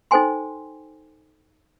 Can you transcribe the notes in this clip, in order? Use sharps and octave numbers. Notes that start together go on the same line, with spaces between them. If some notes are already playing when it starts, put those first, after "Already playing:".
D#4 A4 C5 G5 G#5 C6